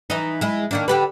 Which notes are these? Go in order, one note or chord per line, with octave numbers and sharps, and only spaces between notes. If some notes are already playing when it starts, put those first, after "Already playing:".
E3 D#4
G#3 E4
D#3 A#3 D4
D3 G4 B4